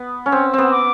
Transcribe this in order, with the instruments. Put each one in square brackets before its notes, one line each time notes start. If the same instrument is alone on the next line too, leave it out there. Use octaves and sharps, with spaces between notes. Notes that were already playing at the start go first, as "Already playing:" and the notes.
Already playing: [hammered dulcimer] B3
C#4
C4
B3 C4
[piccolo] D6